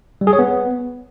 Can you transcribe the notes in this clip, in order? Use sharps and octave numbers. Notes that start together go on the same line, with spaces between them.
G3
G#4
C#5
B3